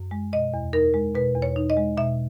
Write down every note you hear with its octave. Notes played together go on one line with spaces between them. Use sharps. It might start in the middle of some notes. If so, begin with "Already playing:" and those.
Already playing: F#2
G#3
B2 D#5
E2
D#4 A#4
G#3
B2 B4
E2
C#5
D#4
D#5
G#3
B2 E5